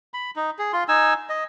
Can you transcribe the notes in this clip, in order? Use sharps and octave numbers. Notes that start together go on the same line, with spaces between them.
B5
D#4
G#4
F4 C6
D#4 G#5 E6
D#5